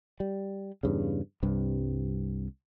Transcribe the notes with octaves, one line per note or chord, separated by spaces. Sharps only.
G3
E2 G2 C#3
C2 G2 C3